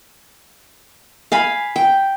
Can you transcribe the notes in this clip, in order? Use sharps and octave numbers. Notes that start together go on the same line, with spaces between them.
F5 G#5 B5
G5